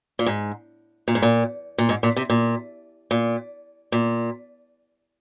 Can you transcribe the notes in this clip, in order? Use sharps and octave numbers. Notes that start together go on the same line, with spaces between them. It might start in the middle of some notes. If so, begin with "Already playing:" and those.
A#2
G#2
A#2
G#2
A#2
A#2
G#2
A#2
C3
A#2
A#2
A#2